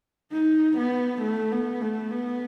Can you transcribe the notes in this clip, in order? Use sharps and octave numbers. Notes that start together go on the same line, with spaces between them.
D#4
B3
A3
B3
A3
B3